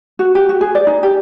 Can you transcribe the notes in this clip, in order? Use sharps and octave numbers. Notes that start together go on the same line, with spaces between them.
F#4
G4
F#4
G#4
D5
D#4
G4